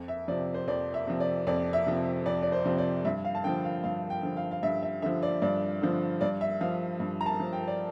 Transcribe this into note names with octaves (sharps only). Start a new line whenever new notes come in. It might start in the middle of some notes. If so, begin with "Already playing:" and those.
Already playing: F2
E5
C3 F3 D5
C5
F2 D5
E5
C3 F3
D5
F2 D5
E5
C3 F3
F2 D5
D5
C5
C3 F3
D5
G2 E5
F5
A5
D3 F3 G5
F5
G2 F5
G5
D3 F3
F5
F5
G2 E5
E5
D3 F3 E5
D5
G2 D5
D3 F3
G2 D5
E5
F3 F5
G2
A#5
A5
F3
G5
D5